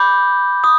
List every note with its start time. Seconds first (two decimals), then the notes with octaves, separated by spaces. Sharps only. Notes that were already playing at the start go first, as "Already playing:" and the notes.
Already playing: B5 D6 G6
0.64 D#6